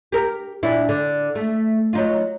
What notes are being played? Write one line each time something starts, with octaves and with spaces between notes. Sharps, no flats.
G4 A#4
A#2 D4 E4
D3
A3
F#3 D#4 F4